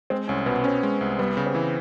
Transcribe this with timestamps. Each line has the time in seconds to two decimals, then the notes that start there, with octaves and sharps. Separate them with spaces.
0.10 G#3 C4
0.28 C2 C#4
0.46 B2 B3
0.64 C4 C#4
0.83 G#3
1.01 C2
1.19 G3 B3
1.37 C#3
1.47 C4
1.55 E3